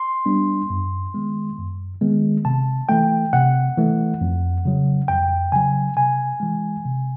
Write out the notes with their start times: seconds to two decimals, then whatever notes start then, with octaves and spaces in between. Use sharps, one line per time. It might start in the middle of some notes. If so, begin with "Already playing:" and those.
Already playing: C6
0.26 G3 B3 D4
0.70 F#2
1.14 D#3 G#3 B3
1.58 F#2
2.01 D#3 G#3 B3
2.45 C3 A5
2.89 E3 A3 G5
3.33 C3 F#5
3.78 E3 A3
4.21 F2
4.65 C#3 F#3
5.08 F2 G5
5.52 C#3 F#3 G#5
5.96 C3 G#5
6.40 E3 G#3
6.85 C3